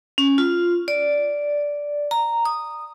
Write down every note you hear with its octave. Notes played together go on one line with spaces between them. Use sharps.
C#4
F4
D5
A#5
D#6